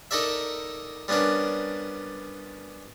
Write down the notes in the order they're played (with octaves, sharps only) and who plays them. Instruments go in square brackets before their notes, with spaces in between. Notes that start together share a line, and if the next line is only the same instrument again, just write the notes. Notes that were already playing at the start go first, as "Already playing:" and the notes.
[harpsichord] D#4 A4 A#4 D5 E5
G3 B3 C#4 D4 A#4